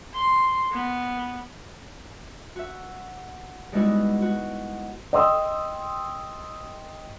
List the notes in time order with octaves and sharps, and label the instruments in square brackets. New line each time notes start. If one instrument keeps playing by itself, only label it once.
[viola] C6
B3
[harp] F#4 E5
G3 G#3 B3 D#4 E4 F#4
F#4
[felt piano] D#5 G5 C6 D#6 E6